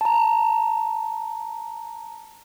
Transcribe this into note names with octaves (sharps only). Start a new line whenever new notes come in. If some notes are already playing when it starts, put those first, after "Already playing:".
A5 A#5